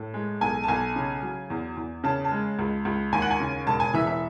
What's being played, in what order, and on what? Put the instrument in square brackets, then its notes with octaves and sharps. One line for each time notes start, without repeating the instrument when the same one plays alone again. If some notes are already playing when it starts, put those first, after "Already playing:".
Already playing: [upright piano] A2
G#3
B1 G#5
A5
B1 G#5
C#3
F#3
E2
E2
C#3 A5
A5
G#3
C#2
C#2
D#2 G#5
F#5
G#5
C#3
E1 A5
G#5
E3 E5
E5